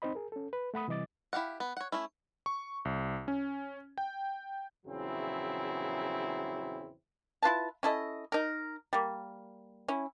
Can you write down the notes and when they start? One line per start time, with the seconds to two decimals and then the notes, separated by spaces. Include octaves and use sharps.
0.02 C4 D#4 C5 D#5 B5
0.15 G#4 A#4
0.32 C#4 A4
0.53 B4
0.74 A3 F#5 B5 D#6
0.88 C3 E3 G3 D#5 D6 A6
1.33 E4 G4 F5 F#5
1.60 B3
1.77 C#5 F#5
1.92 A3 C#4 E4
2.46 C#6
2.85 C2
3.28 C#4
3.98 G5
4.86 A#1 E2 C#3 F#3 C4 E4
7.43 E4 F4 B4 A5
7.83 C#4 E4 A4 D#5
8.32 D#4 A#4
8.93 G3 A#3
9.88 C#4 E4